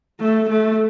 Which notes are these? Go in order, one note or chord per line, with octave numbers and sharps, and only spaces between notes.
A3
A3